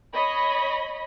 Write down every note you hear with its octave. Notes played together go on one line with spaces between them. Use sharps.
C#5 D#5 B5